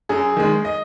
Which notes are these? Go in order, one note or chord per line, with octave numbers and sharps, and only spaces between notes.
F#2 G#4
D#3 G#3
D#5